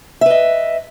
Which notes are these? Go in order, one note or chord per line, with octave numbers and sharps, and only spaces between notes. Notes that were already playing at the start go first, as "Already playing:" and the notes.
B4 D#5 E5